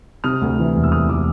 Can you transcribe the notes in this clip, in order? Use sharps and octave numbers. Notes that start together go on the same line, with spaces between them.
C3 D#6 F6
D2
E3
E1
E6
D2 D#6 F6
E3 D6 E6